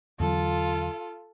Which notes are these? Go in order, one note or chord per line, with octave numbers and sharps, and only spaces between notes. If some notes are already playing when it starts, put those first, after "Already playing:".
E2 D3 F#3 F4 A4